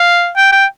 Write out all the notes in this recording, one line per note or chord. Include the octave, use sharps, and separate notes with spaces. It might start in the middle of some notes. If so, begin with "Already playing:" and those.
Already playing: F5
G5
G5